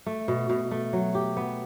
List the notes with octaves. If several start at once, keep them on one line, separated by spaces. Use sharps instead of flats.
A3
B2
B2
A3
F#3
G4
B3